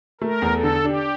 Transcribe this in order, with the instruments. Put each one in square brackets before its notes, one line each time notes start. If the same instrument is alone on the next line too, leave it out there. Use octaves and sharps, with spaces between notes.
[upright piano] A3 [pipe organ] A#4
[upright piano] E2
[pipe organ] A4
[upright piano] D3
[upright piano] D4 [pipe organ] G4